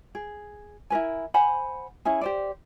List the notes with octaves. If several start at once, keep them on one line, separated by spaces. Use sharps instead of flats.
G#4
E4 A#4 B4 G#5
C5 F#5 G#5 B5
C#4 E4 G#4
G4 C5 D5